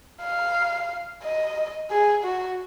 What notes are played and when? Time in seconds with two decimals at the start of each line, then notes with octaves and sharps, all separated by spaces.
0.22 F5
1.23 D#5
1.91 G#4
2.24 F#4